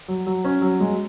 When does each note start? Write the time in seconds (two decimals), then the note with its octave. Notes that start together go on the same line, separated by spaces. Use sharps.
0.08 F#3
0.27 F#3
0.45 C#4
0.62 F#3
0.80 G#3